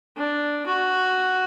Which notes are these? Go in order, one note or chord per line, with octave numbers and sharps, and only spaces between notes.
D4
F#4